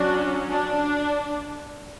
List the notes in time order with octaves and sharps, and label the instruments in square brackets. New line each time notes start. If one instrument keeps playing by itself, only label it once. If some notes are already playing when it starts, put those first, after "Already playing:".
Already playing: [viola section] F#3 C#4 D4 F#4
D4